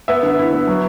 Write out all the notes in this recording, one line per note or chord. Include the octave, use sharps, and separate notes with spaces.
B3 E5
D3
E4
B3
F#3